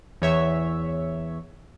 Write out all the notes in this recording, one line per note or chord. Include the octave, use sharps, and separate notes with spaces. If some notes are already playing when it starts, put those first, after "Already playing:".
E2 C#5 E5